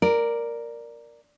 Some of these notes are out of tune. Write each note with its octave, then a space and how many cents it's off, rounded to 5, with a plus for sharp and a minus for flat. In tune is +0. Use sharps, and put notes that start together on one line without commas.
A#4 +0 D5 +0